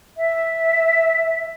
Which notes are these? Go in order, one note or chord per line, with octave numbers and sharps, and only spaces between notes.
E5